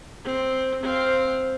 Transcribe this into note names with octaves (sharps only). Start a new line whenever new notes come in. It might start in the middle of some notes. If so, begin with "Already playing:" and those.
C4
C4 F5